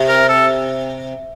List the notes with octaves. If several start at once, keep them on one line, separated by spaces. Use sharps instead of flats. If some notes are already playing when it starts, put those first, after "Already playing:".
Already playing: C3
A#4
A4